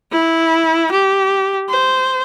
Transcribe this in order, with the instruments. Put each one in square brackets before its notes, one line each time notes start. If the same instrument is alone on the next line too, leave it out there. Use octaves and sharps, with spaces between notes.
[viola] E4
G4
C5